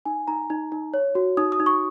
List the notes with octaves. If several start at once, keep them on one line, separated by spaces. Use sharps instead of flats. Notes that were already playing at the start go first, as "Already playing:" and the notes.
D#4 G#5
D#4 A#5
D#4
D#4
C#5
F#4
D#4 D#6
D#6
D#4
C#6